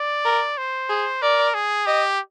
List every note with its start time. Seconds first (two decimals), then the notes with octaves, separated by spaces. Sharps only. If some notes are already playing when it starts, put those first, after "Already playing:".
Already playing: D5
0.25 A#4
0.58 C5
0.89 G#4
1.22 A#4 D5
1.54 G#4
1.86 G4 D#5